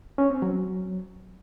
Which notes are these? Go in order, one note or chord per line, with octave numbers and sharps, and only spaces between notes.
C#4
C4
F#3